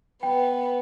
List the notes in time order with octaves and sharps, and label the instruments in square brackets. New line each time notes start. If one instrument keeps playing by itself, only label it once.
[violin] B3 [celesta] G5